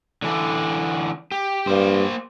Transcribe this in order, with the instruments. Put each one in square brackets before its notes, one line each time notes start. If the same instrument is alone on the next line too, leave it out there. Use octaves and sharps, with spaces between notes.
[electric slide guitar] D3 E3 D4
G4
[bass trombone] G2 [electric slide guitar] A#3 C5